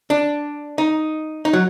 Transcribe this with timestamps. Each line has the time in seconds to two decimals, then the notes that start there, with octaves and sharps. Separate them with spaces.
0.10 D4
0.78 D#4
1.45 D#4
1.53 F#3